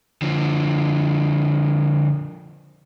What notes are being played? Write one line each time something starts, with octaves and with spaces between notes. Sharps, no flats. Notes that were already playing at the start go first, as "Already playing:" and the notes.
D3 F3